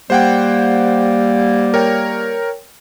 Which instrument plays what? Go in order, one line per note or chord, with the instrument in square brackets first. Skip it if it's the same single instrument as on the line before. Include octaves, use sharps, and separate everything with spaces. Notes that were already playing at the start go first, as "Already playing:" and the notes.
[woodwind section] G3 A#3 [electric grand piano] C5 F#5 G5
[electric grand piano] A#4 C#5 G5